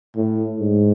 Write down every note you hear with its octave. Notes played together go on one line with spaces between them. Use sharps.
A2
G#2